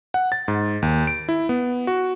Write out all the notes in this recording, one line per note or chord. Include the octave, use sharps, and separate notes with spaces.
F#5
A6
G#2
D#2
D7
E4
B3
F#4